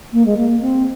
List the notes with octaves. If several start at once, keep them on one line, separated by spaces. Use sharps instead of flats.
A#3
G#3
A#3
C4